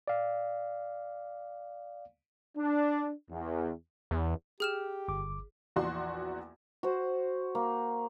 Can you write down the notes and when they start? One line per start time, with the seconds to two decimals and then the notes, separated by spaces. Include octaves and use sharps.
0.08 D5 F5
2.57 D4
3.30 E2
4.11 E2
4.60 G4 G#4 F6 E7
5.08 G1 D6
5.76 A#1 E2 F#4 C6
6.83 F#4 C5
7.55 A#3